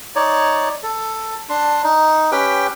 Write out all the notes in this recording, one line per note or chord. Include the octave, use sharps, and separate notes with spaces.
D#4 C#5 D5
A4
D4 C6
D#4
C#4 G4 B4 G5